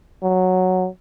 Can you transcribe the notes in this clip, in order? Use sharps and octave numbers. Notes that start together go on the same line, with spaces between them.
F#3